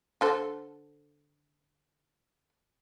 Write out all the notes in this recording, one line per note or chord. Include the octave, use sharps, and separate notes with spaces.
D3 A4 C5